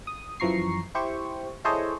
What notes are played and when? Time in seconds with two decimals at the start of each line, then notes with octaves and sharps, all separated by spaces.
0.07 D#6
0.40 F#2 E3 F3 A#5 C#6 C7
0.95 E4 G4 C5 C#6
1.64 E4 G#4 A4 C5 C#5 D#5